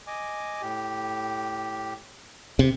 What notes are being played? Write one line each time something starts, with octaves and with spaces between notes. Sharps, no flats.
D#5 G#5 D6
A2 G4
C3